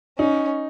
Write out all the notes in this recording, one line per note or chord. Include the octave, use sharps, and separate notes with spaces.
C#4 D#4